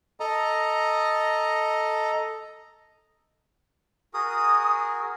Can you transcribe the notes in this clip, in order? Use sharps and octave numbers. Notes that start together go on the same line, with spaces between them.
A4 D#5 A#5
F#4 G#4 A#4 D#6